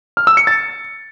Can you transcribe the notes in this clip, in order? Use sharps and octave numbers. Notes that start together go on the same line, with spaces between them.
F6
E6
C#7
A6